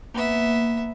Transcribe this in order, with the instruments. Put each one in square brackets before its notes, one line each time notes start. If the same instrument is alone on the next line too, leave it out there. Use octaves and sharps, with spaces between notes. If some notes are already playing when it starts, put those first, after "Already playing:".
[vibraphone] A#3 [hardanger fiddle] B3 E5